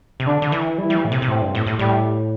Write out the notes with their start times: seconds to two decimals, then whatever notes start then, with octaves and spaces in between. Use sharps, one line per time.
0.20 C3
0.27 D3 D4
0.42 D3
0.52 E3
0.78 G3 E4
0.90 G3
0.95 E3
1.05 A2
1.12 C3
1.22 C3
1.28 A2 C4
1.41 G2
1.55 A2
1.66 A2
1.79 A2 G3